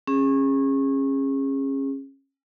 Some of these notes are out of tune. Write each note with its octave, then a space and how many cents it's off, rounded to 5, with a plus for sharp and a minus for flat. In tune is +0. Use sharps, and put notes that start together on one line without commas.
C#4 -25 G#4 -20